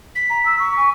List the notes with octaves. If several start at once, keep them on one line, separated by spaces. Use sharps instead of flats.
B6
A#5
E6
C#6
G#5